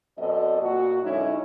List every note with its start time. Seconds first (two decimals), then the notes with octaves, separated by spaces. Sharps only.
0.18 F#2 B2 C4 A4 D5 D#5
0.61 A#2 F#4
1.03 F#2 D3 G#3 C#4 D#4 E4